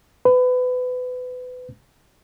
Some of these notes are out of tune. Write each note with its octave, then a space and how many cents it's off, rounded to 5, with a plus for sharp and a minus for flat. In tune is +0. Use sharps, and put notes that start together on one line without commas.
B4 +25